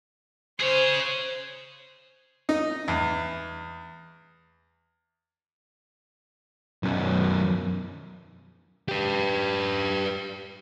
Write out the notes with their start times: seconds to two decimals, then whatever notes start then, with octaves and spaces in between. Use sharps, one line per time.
0.60 G#4 C5 C#5
2.49 D#4
2.88 E2
6.83 B1 F#2
8.89 G4 B4